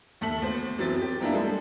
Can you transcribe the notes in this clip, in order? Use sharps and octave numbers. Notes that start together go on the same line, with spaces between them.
D#2 A3 A4 B6 F#7
D2 B3 C5
F#1 E3 F#3 B3 C4 A6
G4
F#2 F3 A#3 B3 D4 E4
G3 G#3 A4